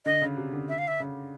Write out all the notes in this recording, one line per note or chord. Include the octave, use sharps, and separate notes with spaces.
D3 D#5
C#3
C3
D3
E5
F5
E5
C#3